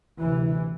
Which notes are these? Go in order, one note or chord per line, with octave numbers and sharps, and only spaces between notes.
D2 C3 E3